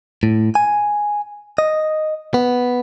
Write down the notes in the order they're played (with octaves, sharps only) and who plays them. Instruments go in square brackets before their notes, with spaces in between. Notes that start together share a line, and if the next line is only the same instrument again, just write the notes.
[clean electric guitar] A2
G#5
D#5
B3